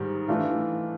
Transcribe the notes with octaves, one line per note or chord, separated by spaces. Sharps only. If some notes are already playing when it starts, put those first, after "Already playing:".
Already playing: G#2 D#3 G3
E3 A3 D4 F4